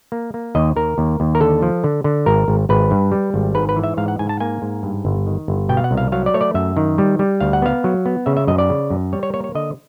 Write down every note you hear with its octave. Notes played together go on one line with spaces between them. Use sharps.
A#3
A#3
D#2 D#5
D#2 A#4
D#2
D#2
A#4
D3 A4
F3
D3
D3
G#1 A#4
G#1
G#1 B4
G2
G3
G#1
G#2 B4
B4
E3
E5
G#2 F5
F#5
G#2 G#5
A5
A#3 G#5
G#2
G2
G1
D#3
G1
B2 G5
F5
F#5
C2
F5
F#3 F5
D5
A3 C#5
D5
F#2 E5
D#3
G3
G3
D2 F5
F#5
B3 F5
F#3
B3
C#3 E5
E5
F#2 D#5
D5
C#3
F#2
G3 C#5
C#5
A#3 C#5
C#5
D3 D#5